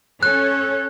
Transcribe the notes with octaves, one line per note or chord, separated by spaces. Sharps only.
C#4 A4 C#5 F#6